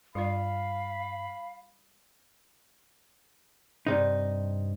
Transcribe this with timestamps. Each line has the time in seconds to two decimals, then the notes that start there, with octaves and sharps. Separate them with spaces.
0.15 G2 G3 F4 D5 F5 B5
3.87 G2 C3 D#4